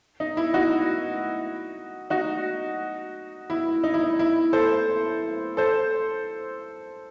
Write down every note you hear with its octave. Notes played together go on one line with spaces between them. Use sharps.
D#4
E4
D#4 F#4
D#4 F#4
E4
D#4
E4
D#4
E4
A4 C5
A4 C5